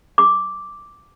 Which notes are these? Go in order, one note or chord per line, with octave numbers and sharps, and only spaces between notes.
D6